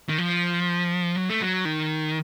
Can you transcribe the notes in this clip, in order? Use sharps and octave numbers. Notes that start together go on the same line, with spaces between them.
D#3
F3
F#3
A3
F#3
D#3